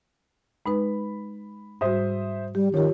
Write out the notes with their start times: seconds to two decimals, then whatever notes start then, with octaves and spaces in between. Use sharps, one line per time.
0.66 G#3 D#4 B4 B5
1.81 G#2 G3 F#4 C5 E5 D#6
2.55 G3 G4
2.74 D#3 F3 G4 C#5